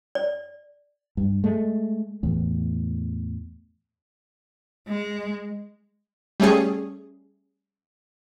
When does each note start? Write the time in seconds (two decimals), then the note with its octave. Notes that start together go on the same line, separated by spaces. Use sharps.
0.15 D5
1.17 G2
1.44 G#3 A3
2.23 E2 A2
4.88 G#3
6.40 G3 A3 C#4 G#4